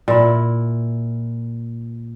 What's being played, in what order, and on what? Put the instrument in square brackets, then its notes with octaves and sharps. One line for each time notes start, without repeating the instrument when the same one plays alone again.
[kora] A#2 E4